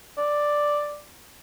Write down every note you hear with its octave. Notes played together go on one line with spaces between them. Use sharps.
D5